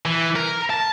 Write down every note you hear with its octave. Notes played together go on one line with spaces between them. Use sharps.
E3
A#4
A5